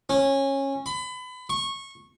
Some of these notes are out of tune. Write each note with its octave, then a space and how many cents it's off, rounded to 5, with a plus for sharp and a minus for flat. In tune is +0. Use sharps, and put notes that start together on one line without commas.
C#4 -20
B5 +30
C#6 -20